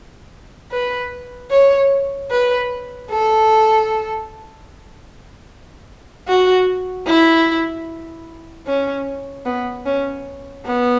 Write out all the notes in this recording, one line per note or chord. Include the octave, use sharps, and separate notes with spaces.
B4
C#5
B4
A4
F#4
E4
C#4
B3
C#4
B3